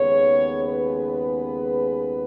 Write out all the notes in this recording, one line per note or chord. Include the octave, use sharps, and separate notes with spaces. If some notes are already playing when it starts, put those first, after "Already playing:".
Already playing: D#2 C#3 G#3 B3 C#5
B4